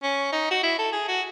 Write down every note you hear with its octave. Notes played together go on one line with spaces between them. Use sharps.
C#4
D#4
F#4
E4
A4
G#4
F#4